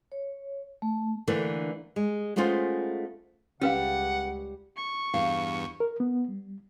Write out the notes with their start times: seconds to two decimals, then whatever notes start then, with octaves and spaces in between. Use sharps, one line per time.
0.12 C#5
0.82 A3
1.27 D3 E3 A3 A#3
1.96 G#3
2.36 G#3 A3 B3 C#4 F4 C5
3.61 C#2 G3 C#4 B4 F5 F#5
4.77 C#6
5.14 E2 G2 F5
5.80 A#4
6.00 B3
6.28 G3